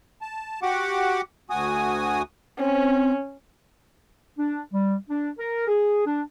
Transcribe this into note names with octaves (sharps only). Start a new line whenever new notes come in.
A5
F#4 G4 F#5 D6
D2 F#4 G#5 D#6
C4 C#4
D4
G3
D4
A#4
G#4
D4